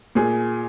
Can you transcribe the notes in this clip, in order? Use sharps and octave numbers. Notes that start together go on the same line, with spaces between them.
A#2 G#4